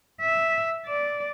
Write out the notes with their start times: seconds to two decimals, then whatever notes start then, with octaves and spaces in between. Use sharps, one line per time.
0.20 E5
0.86 D5